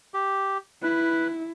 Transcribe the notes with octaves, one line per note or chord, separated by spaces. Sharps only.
G4
E4 B4